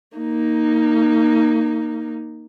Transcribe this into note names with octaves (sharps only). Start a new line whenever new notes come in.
A#3 D#4